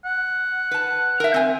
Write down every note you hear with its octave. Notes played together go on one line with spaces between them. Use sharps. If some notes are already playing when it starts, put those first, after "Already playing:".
F#5
B4 A5
A#4 E5
C4 G#5